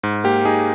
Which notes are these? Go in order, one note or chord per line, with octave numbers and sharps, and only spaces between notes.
G#2
A#3 G4
D#4 G#4